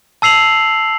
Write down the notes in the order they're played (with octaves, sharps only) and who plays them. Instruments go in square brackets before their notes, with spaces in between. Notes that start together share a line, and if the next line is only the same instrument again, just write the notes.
[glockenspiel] A5 E6 C7 F7 F#7